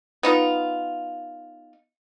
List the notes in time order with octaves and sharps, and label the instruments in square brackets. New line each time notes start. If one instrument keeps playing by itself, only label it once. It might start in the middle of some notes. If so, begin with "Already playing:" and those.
[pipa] B3 D#4 F4